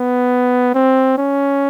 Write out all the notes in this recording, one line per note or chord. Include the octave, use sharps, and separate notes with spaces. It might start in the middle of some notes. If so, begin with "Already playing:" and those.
Already playing: B3
C4
C#4